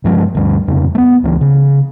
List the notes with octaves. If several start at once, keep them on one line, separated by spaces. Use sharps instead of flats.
G2 F3 G#3
D2 G2
D#1 F2 C#3
A3 B3
C#2 E3
C#3